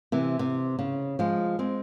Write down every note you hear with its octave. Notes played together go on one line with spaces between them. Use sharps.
C3 E3
C3
C#3
F3 G#3
G#3 C4